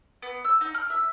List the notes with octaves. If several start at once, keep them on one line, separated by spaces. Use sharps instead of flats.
B3
E6
D#4
F6
E5